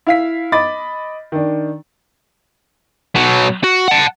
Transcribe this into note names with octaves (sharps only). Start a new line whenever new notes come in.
E4 F5 B6
D#5 B5 D6 A6
D#3 D4
B2 F#3
F#4
F#5 A5